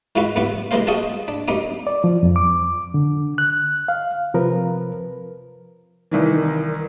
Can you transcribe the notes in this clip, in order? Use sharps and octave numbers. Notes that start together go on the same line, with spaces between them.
E3 G#3 F4 F#4 B4
F#2 C3 E3 B3
C2 E3 G#3 A#3 C5 F5
F#4 G#4 D#5 F5 A5
D4
F#2 C3 D#4 D6
D5
F3
F2
D6
D3
F#6
F5
C3 F3 A#4 B4
C2 D#3 E3